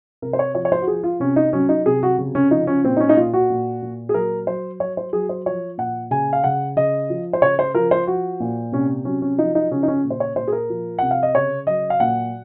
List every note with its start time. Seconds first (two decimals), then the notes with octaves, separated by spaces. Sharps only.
0.22 C3 A#4
0.33 C5
0.39 C#5
0.55 F3 C#5
0.65 C#5
0.72 C5
0.81 F#4
0.87 F3 G#4
1.03 F4
1.20 C3 C#4
1.36 D#4
1.53 F#3 C#4
1.69 D#4
1.86 C3 G#4
2.03 F#4
2.18 C#3
2.35 C#4
2.51 F3 D#4
2.67 C#4
2.84 A#2 C4
2.97 D#4
3.00 C#4
3.09 D#4
3.17 A#2 F4
3.34 F#4
3.50 A#2
3.82 A#2
4.09 G#4
4.14 F#3 A#4
4.47 F#3 C5
4.80 F#3 C#5
4.97 C5
5.13 F#3 G#4
5.29 C5
5.46 F3 C#5
5.78 A#2 F#5
6.11 C#3 G#5
6.33 F5
6.44 C#3 F#5
6.76 C#3 D#5
7.10 F3
7.33 C5
7.41 C#3 C#5
7.59 C5
7.75 F3 A#4
7.91 C5
8.07 F3 F#4
8.40 A#2
8.72 C3 C#4
9.05 F#3 C#4
9.22 C#4
9.38 F3 D#4
9.55 D#4
9.71 C#3 C#4
9.83 D#4
9.88 C#4
10.04 A#2
10.10 C5
10.20 C#5
10.36 A#2 C5
10.48 G#4
10.52 A#4
10.70 F3
10.98 C3 F#5
11.11 F5
11.23 D#5
11.35 C#3 C#5
11.67 F#3 D#5
11.90 F5
12.00 A#2 F#5